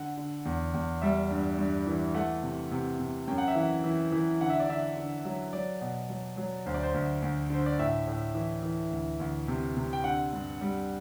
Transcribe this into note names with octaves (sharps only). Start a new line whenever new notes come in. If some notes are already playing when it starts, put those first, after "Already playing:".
Already playing: D3 F#5
D3
E2
E2
G3 E5
G2
G2
E3
A3 F#5
C3
C3
C3
F#2 G5
F#5
E5
E3 F#5
E3
E3
D3 F#5
E5
D5
D3 E5
D3
F#3
F#3 D5
B2
F#3
F#3
D2 C5
D5
C5
D2
D2
D3 C5
D5
A2 E5
A2
E3
E3
D2
D2
C3
C3
G5
D3 F#5
G2
G3